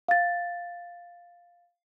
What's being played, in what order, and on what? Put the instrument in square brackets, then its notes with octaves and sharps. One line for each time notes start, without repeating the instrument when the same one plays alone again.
[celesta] F5 A6